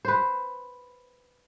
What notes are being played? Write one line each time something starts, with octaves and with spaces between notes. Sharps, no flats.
B4 C5